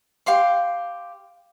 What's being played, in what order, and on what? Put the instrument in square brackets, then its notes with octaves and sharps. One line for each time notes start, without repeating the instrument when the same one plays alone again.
[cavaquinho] G4 F5 C6 D6